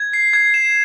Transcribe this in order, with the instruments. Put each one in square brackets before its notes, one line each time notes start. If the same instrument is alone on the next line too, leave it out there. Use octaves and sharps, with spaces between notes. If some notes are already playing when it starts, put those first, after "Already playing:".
Already playing: [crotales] G#6
C7
G#6
E7